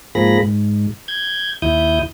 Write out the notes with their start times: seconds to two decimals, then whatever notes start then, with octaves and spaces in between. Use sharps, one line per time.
0.15 G#2 F3 A#3 G#4 B5 A#6
0.41 G#2
1.08 G6 G#6
1.62 D#2 E4 D#6 G6